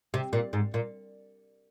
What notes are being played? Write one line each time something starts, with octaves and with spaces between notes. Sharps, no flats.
C3
A#2
G#2
A#2